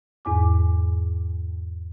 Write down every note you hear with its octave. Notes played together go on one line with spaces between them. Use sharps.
E2 G#2 G#5 D6